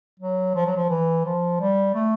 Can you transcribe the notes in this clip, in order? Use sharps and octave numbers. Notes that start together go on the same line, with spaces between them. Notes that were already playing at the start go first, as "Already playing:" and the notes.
F#3
F3
F#3
F3
E3
F3
G3
A3